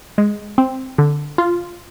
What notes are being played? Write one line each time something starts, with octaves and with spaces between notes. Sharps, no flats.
G#3
C4
D3
F4